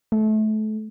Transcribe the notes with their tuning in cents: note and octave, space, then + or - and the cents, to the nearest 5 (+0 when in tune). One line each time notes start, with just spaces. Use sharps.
A3 -30